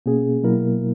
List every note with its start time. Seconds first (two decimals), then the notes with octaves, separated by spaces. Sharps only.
0.06 B2 A#3 C#4 G#4
0.43 B2 F#3 A#3 E4 A#4